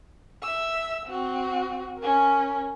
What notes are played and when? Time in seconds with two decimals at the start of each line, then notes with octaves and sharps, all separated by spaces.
0.43 E5 E6
1.06 C4 F#4
1.98 C#4 A#4